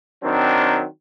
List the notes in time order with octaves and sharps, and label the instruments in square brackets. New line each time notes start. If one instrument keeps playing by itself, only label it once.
[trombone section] D#3 F#3 C4 D4